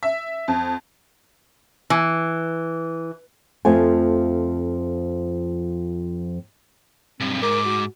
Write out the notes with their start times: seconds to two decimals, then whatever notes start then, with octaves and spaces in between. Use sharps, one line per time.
0.03 E5
0.48 F2
1.90 E3
3.65 F2 F3 A3 G#5
7.20 B1 G2 C4
7.42 G#2 A#4 D6
7.65 F#4